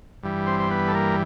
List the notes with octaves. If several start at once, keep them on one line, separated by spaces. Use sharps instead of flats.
G2 E3 G3
C4 C5
C5
B3 B4
A4
A#3 A#4